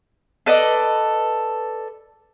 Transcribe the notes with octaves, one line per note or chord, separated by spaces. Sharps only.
A4 B4 D5 D#5